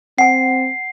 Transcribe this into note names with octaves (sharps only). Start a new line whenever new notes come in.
C4 F#5 G#5 C7